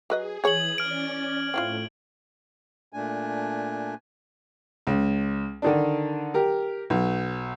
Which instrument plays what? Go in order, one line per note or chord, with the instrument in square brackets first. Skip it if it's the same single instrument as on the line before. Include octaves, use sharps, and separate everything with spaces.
[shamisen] F#3 B4 D#5 [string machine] G#4
[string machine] E3 D#6 [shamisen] G#4 C#5 [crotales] G#6 F#7
[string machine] C#4 D5 [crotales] F6 D7
[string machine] A2 A3 [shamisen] C4 E4 F4
[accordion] A#2 A3 D4 G#5
[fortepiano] C#2
D3 D#3 D4
G4 A#4
B1